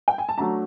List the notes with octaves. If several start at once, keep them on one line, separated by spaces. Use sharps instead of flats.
G5
G#5
A5
F#3 A3 D4 F#4 A#5